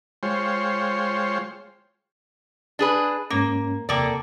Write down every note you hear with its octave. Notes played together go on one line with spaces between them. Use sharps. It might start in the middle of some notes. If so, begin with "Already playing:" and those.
G#3 F4 C5 C#5 G5
D4 G#4 B4
G#2 A#3 C#4
E2 C3 A#3 A4 D5 G5